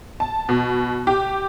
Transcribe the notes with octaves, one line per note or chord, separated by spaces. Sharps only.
A5
B2
G4